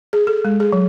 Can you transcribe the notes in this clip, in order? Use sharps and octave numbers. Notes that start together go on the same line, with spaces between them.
G#4
A4
G#3
G#4
F#3